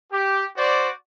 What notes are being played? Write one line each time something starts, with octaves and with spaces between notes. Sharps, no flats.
G4
F#4 C5 D5